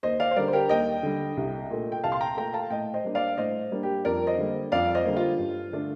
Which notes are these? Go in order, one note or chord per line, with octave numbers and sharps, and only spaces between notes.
D#2 C5 D#5
D5 F5
C5
D3 G3 A#4 D5
C5
G4 A#4
D#2 D#5 G5
D3 G3
C2
A#2 A3
G5
C2 F5 A5
C6
G5 A#5
A#2 A3 G5 A#5
F5 A5
A2 D#5 G5
C5 D#5
G3 A#3 D4
D5 F5
A2 C5 D#5
G3 A#3 D4
G4
F2 A#4 D5
C5 D#5
D3 G3 A#3
F2 D5 F5
C5 D#5
D3 G3 A#3
F4
G2
D3 A3 D4